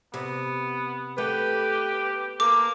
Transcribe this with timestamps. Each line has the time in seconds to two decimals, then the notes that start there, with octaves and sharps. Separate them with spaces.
0.14 C3 B3
1.18 A3 B3 G4 B4
2.40 A#3 A4 D6